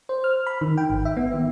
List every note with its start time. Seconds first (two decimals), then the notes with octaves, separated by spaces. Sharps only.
0.09 C5
0.24 F6
0.47 B5
0.61 D#3
0.78 G5
0.90 G#1
1.05 E5
1.17 B3
1.34 D#3